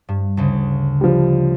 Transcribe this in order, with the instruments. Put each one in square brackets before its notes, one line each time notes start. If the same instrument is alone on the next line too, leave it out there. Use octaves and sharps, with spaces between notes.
[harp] G2
D2 C#3
[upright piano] F3 G3